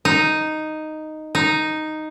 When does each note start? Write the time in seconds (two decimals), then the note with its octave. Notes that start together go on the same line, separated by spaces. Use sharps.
0.05 D#4
1.35 D#4